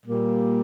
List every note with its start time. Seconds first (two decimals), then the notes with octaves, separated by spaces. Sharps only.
0.06 A#2 G3 A#3